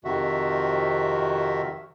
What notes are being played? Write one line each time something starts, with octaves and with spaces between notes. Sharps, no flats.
F2 C3 D#3 F#4 E5